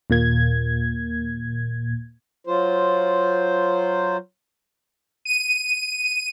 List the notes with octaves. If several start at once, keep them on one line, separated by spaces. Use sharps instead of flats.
D#2 A#2 A#3 G#6
F#3 F4 C5
D#7